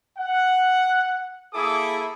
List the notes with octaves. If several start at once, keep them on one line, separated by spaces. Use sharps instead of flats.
F#5
A#3 E4 G#4 A4 D6 D#6